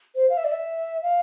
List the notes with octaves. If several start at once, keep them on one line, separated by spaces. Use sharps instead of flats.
C5
F5
E5
D5
E5
F5